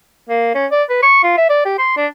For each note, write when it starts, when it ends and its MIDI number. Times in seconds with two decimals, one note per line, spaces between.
0.29 0.50 58
0.54 0.66 61
0.71 0.83 74
0.90 0.99 71
1.03 1.22 85
1.23 1.34 65
1.38 1.48 76
1.49 1.64 74
1.65 1.75 67
1.78 1.96 84
1.97 2.07 62